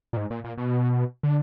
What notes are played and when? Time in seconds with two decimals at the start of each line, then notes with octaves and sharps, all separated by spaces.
0.13 A#2
0.17 G#2
0.30 A#2
0.44 A#2
0.58 B2
1.23 D3